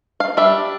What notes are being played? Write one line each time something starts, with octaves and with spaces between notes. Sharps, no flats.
F5
G3 D4 E5